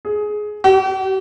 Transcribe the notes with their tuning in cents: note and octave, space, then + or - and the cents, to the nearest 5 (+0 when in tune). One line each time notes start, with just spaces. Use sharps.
G#4 +15
G4 -45